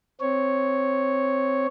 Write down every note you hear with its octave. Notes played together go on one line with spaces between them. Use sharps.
C4 C#5